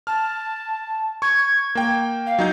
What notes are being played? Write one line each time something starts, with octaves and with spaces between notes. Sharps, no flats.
A5 F6
C#6 G#6
A#3 G5
F5
F#3 D#4 G6